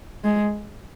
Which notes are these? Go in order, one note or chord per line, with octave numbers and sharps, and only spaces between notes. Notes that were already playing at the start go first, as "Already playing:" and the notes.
G#3